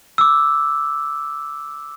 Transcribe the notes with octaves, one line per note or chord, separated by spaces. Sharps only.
D6 E6